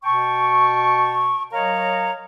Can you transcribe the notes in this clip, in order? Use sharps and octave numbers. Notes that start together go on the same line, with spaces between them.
B2 G5 A5 C#6
F#3 A#4 C#5 D#5 F5 A#5